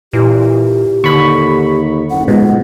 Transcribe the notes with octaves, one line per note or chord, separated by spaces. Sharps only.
A#2 E3 G4
D#2 D3 B5 C#6
F#1 F#5
G#2 B2 F4